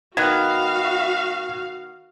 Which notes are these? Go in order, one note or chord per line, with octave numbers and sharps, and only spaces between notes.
D#3 B3 F#4 F5 F#6 G#6